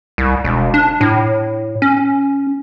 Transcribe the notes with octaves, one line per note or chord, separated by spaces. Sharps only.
C2
E1
D4
A2
C#4